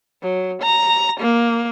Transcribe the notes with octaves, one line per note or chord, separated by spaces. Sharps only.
F#3
A#5
A#3